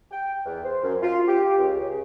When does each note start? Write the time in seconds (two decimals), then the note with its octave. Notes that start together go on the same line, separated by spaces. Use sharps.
0.11 G5
0.46 E2
0.64 C5
0.83 F#2
1.02 F4
1.27 G4
1.58 C#2
1.80 C#3